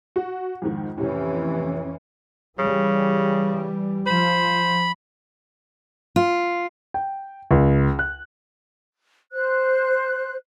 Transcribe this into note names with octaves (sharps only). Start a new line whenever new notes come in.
F#4
F2 G#2 D#3
F2 A2 C3 E3 C#4
C#3 E3 G3
F3 C5 B5
F4
G5
C#2
F#6
C5 F#6